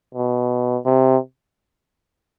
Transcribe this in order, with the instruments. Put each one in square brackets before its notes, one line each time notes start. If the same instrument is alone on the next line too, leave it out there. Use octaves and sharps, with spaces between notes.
[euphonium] B2
C3